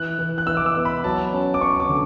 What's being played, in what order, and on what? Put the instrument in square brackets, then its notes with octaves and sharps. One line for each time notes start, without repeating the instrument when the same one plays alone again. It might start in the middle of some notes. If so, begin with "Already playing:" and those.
Already playing: [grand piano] E3 F#6
E3
F#6
E3 E6
D6
E6
B3
B5
F#3 A5
C#4
D6
C#4 C#6
D6
D3